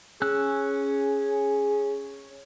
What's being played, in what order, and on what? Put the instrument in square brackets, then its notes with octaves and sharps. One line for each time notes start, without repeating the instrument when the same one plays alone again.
[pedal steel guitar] C#4 E6 F#6 [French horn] G#4